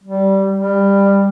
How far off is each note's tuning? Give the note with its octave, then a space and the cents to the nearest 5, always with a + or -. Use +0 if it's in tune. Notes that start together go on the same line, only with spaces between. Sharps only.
G3 -15
G3 +15